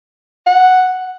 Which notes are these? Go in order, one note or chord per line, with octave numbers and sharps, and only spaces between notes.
F#5